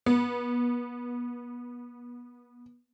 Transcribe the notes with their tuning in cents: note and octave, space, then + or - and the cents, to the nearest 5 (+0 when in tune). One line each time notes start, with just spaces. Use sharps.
B3 -30